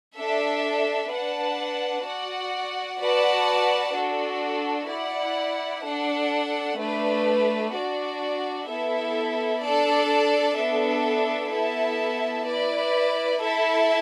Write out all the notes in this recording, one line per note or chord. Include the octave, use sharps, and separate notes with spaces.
D4 A4 E5
D4 B4 F#5 A5
F#4 D5 F#5
F#4 B4 D5 F#5 A5
D4 F#4 A4
E4 D5 F#5
D4 A4 F#5
A3 D4 B4
D4 F#4 D5
B3 E4 A4 E5
D4 A4 D5 A5
B3 D4 A4 E5
B3 E4 A4 E5 A5
E4 B4 D5
E4 A4 E5 A5